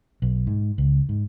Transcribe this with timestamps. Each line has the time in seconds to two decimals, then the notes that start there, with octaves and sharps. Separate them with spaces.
0.22 B1
0.47 G#2
0.78 C#2
1.09 G#2